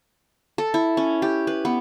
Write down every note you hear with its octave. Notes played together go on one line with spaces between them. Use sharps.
A4
E4
C#4
G4
B4
B3